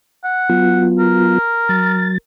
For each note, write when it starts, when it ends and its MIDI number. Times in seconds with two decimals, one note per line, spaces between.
0.24 0.84 78
0.50 1.38 54
0.50 1.38 59
0.50 1.38 65
0.99 2.15 70
1.69 2.18 54
1.69 2.18 93